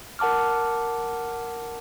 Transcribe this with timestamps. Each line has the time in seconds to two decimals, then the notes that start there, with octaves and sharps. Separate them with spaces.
0.19 A#4 F#5 A5 D6 F6